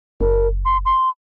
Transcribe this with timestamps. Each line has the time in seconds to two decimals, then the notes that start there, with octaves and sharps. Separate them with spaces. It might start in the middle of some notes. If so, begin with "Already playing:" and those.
0.21 F#1 A#4
0.65 C6
0.85 C6